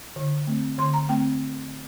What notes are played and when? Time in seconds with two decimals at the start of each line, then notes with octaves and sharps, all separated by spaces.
0.16 D3
0.47 A3 C4
0.78 D3 C6
0.93 A#5
1.08 A3 C4 G5